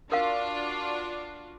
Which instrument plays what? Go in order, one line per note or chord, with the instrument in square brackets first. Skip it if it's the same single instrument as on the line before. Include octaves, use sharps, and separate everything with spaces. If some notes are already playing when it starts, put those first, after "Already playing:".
[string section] D4 F4 F#4 [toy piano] A#4 F5